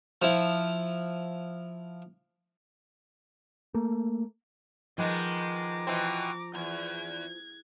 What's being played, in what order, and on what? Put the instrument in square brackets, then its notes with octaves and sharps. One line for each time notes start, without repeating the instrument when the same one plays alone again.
[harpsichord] F3 E4
[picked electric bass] A3 A#3
[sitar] D#3 G#3 B3 [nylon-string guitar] F3 [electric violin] A#5 D6
[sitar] B2 E3 C4
[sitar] E2 [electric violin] G#6